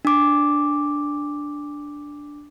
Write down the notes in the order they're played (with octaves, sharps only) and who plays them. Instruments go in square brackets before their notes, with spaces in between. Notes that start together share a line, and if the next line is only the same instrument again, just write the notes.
[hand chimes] D4 D6